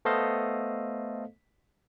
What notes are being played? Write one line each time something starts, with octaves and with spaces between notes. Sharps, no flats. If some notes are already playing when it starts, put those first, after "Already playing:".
A3 B3 A4 C5 D#5 F5